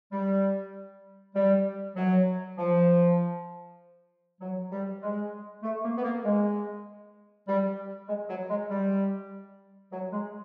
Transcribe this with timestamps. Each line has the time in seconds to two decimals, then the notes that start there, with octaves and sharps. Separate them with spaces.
0.12 G3
1.35 G3
1.96 F#3
2.58 F3
4.41 F#3
4.72 G3
5.02 G#3
5.63 A3
5.84 A#3
5.97 B3
6.04 A#3
6.25 G#3
7.48 G3
8.08 G#3
8.29 F#3
8.49 G#3
8.70 G3
9.92 F#3
10.12 G#3